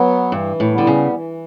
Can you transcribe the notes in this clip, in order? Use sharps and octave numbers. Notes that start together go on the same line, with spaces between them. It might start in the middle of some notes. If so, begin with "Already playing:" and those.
Already playing: F#3 B3
G2 E3
A2
D3 G3 B3
C#3
E3